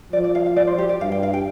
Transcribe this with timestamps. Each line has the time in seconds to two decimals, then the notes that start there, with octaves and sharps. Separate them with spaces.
0.13 F3 D5
0.24 D5
0.35 F5
0.46 F5
0.56 D5
0.67 C5
0.78 G4
0.89 D5
1.00 G2 F5
1.12 G5
1.23 F5
1.33 G5